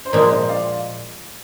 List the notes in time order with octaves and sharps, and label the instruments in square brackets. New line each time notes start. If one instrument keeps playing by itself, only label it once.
[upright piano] C5
[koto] A#2 F3 G#3 [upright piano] A#4 D5
[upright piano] C5 D#5
D5 F5